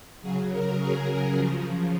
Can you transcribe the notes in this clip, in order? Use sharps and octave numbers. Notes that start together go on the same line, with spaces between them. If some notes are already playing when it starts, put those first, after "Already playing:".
C#3 F#3 G#4
A#4
G#4
G#4
C#3 F3